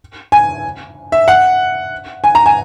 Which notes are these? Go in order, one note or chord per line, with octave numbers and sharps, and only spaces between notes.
G#5
E5
F#5
G#5
A#5
G#5